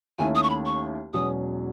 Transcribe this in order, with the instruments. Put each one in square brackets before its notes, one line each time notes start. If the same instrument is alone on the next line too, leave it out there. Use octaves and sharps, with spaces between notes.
[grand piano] D#2 D#3 A3 C#4 E4 [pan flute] G#5
[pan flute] D#6
C#6
B5
C#6
[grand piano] E1 E2 B2 F#3 C#4 [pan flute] D#6